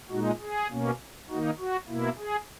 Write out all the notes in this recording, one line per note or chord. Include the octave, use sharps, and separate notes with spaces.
A#2 G#3 D#4 F#4
G#4
B2 A#3 C#4
D#3 A#3 D#4 F#4
F#4
B2 A#3 E4
G#4